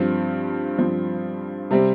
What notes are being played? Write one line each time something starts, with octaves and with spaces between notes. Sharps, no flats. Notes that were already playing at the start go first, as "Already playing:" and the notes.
Already playing: G2 F3 C4
G2 F3 C4
C3 G3 C4